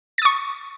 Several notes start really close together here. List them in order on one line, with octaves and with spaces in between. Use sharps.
A6 D#6 C#6